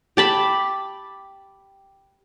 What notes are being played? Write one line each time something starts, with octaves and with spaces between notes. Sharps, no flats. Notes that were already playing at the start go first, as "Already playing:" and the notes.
G4 A5 B5